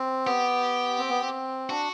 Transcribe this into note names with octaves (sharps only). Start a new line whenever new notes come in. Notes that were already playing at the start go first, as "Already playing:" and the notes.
Already playing: C4
B3 G4
C4
B3
C4
D4 F#4